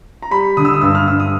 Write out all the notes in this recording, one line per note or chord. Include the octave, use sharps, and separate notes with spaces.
A#5
G3 B5
D3 D#6
E6
D#6
G2 E6
F6
G2 E6
D#6